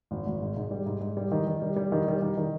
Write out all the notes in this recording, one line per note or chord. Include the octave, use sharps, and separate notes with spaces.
G#1
G#1
G#2
G#2
G3
G#2
G#2
G3
D#3
D#3
G3
G3
D#3
G3
D#3
D#3